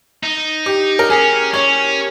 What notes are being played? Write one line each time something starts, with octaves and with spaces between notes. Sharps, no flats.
D#4
G4
A#4
C#4 G#4
C#4 C#5